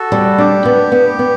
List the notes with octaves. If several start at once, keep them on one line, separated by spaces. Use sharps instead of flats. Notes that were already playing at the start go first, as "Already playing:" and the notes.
Already playing: F#4 A4
G3
D4 G4
B3
B3
B3